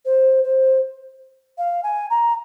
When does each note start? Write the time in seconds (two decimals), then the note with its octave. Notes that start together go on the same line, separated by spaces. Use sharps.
0.05 C5
0.43 C5
1.58 F5
1.83 G#5
2.10 A#5